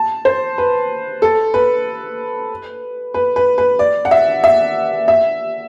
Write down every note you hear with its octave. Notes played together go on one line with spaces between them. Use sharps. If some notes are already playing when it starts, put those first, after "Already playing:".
Already playing: A5
C5
B4
A4
B4
B4
B4
B4
D5
F#5
E5
E5
E5